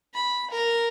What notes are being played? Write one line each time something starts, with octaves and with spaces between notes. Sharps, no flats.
B5
A#4